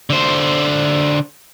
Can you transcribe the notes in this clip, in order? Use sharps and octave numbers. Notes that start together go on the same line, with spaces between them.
D3 C5